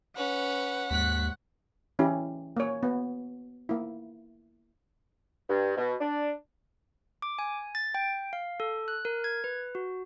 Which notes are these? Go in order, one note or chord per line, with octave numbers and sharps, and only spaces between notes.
C#4 B4 F#5
D#2 G#2 C#6 F#6 B6
E3 C#4 E4 G4
A#3 C#5
B3
A#3 E4
G2
B2
D4
D6
G#5
A6
G5
F5
A4
F#6
A#4
G#6
B4
F#4